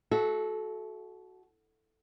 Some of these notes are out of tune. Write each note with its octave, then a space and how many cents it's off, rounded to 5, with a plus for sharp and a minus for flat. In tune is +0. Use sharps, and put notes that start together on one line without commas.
F#4 +0 A4 -25 E5 +0